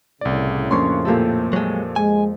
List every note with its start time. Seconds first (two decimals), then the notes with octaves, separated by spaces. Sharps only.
0.21 C2 A2 C#3 D5
0.71 F2 A#3 C#4 D4 C6 C#6
1.05 A#2 A3 A#3 G4 A4
1.53 F2 F#3 G#3
1.96 G#3 G#5